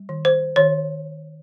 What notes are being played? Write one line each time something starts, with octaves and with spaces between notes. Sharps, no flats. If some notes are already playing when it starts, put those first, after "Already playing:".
Already playing: G3
D#3
C5
D#3 C#5